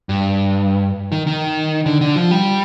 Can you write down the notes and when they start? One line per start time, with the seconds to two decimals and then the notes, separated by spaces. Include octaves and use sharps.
0.09 G2
1.12 D#3
1.27 D#3
1.86 D3
2.01 D3
2.16 F3
2.31 G3